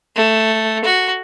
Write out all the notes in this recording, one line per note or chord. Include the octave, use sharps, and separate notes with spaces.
A3
F#4